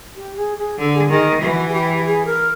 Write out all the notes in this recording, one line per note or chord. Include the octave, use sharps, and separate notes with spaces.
G4
G#4
G#4
D3 A4
G#4
D#3 G#4
E3 F#4
G#4
G4
G4
G#4
A#4